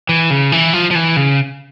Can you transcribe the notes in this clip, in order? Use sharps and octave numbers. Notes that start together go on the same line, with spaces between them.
E3
C#3
E3
F3
F3
E3
C#3